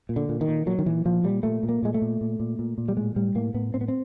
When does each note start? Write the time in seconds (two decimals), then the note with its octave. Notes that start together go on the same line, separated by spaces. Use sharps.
0.09 A#2
0.16 D3
0.29 A#2
0.41 D#3
0.48 A#2
0.66 A#2 F#3
0.79 D#3
0.86 A#2 E3
1.05 A#2 F3
1.24 A#2 G3
1.43 A#2 A3
1.63 A#2
1.69 A#3
1.82 A#2 G#3
1.94 A3
2.02 A#2
2.21 A#2
2.40 A#2
2.59 A#2
2.78 A#2
2.88 G3
2.97 A2 G#3
3.16 A2 G3
3.35 A2 A#3
3.54 A2 B3
3.74 A2 C4
3.81 B3
3.88 C4